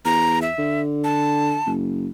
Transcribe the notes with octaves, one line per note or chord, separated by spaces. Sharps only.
E2 A#5
E5
D3
A5
F#1